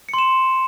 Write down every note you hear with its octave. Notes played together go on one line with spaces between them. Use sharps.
C6 C#7 E7